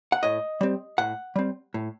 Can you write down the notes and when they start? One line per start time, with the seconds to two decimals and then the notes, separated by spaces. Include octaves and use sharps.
0.12 F#5
0.23 A2 D#5
0.61 G3 C4
0.98 A2 F#5
1.36 G3 C4
1.74 A2